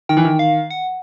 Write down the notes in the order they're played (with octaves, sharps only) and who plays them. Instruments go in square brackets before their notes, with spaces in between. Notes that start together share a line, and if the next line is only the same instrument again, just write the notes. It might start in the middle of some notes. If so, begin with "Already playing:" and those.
[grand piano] D#3 [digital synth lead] G5
[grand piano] E3
D#3
[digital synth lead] F5
F#5